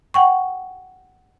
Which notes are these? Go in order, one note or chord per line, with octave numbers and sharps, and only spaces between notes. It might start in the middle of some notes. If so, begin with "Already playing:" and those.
F#5 G5 C#6